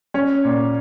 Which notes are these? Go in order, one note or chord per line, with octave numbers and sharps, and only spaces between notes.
C#4 C#5
A#2